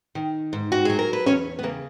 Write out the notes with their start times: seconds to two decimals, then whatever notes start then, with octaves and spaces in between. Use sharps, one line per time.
0.15 D#3
0.53 G#2
0.72 F#4
0.85 F#3 G#4
0.99 A#4
1.13 B4
1.26 E2 C#4 C#5
1.59 B3
1.63 C#3 A#3